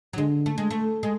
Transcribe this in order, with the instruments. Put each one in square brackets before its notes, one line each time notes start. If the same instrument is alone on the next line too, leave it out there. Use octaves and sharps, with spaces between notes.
[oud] F#3
[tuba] D3 [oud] G#3
[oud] A3
G#3
A3
G#3